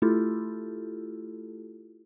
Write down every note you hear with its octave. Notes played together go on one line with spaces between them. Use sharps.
A3 E4 F4 G4 A4